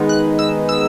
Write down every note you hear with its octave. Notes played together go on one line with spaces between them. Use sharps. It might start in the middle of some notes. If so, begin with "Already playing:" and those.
Already playing: D#3 G#3 B3 D#4
F#6
E6
E6